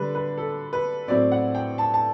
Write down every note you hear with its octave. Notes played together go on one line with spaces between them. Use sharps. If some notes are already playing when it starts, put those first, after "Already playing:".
Already playing: D3 G3 D4 B4
B4
A4
B4
A2 F#3 C4 E4 D5
F#5
G5
A5
A5